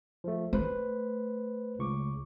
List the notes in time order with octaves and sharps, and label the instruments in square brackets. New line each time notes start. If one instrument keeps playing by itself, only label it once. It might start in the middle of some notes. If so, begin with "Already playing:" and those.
[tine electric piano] F3 A3
[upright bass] A3 [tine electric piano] B4 C5
[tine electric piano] C#2 C#6 D6